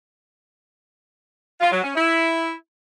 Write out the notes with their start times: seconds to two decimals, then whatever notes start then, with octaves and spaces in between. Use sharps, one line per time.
1.60 F4
1.72 F#3
1.83 C#4
1.95 E4